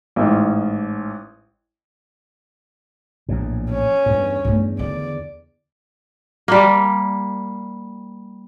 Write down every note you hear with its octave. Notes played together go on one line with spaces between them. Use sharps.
A1 G#2
A#1 E2 A2
C#4
E2 G2
E2 G2 A3
D3 D#3 D5
G3 A#3